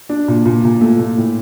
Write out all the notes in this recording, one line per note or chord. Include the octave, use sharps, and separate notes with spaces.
D4
A#2
A#2
A#2
A3
A#2
A2